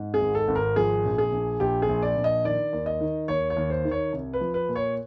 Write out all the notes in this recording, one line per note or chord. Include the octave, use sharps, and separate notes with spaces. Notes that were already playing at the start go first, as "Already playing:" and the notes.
Already playing: G#2
G#4
G#1
A4
G#1
A#4
F3 G#4
A#1
G#4
A#1
A#1 G4
G#4
A#1
D5
A#1
D#5
D#3 D5
D#2
D#5
D#3
D#2 C#5
C#5
D#2
C5
D#3
C#5
C2
B4
F3
B4
A#2
C#5